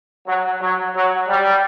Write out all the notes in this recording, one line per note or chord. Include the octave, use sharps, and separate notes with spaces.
F#3
F#3
F#3
G3